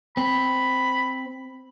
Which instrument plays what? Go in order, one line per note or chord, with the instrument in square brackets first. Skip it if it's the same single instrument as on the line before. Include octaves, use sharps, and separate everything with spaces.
[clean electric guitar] C4 [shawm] B5